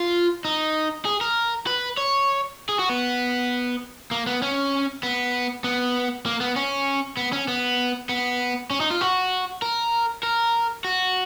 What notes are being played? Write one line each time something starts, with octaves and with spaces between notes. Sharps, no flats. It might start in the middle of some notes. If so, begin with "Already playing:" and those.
Already playing: F4
D#4
G#4
A#4
B4
C#5
G#4
F#4
B3
A#3
B3
C#4
B3
B3
A#3
B3
C#4
B3
C#4
B3
B3
C#4
D#4
F4
F#4
A#4
A#4
F#4